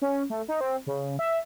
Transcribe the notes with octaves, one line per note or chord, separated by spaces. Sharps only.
C#4
A3
D#4
C4
C#3
E5